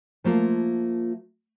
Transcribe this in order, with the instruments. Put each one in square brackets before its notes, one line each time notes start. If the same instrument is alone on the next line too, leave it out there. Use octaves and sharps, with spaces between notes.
[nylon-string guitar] F3 A3 A#3 F4